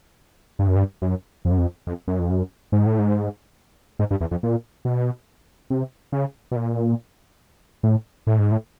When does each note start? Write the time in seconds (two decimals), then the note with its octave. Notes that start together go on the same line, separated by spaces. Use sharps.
0.59 G2
0.68 F#2
0.76 G2
1.02 F#2
1.45 F2
1.51 F#2
1.58 F2
1.87 F2
2.08 F#2
2.19 F2
2.30 F#2
2.72 G#2
2.86 A2
2.99 G#2
3.99 G#2
4.11 G2
4.21 E2
4.31 F2
4.43 A#2
4.85 B2
5.70 C3
6.12 C#3
6.52 B2
6.56 A#2
7.83 A2
8.27 A2
8.39 G#2
8.51 A2